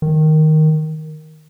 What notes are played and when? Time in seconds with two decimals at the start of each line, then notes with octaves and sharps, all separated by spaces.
0.02 D#3